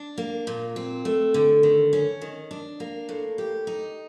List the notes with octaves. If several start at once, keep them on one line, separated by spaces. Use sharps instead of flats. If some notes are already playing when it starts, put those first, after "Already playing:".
Already playing: D4
A#3
A#2
C4
A3
D3
D#3
C#4
D#3
D4
A#3
A2
G4
D#4